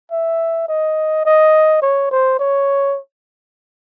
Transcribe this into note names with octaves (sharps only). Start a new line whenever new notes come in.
E5
D#5
D#5
C#5
C5
C#5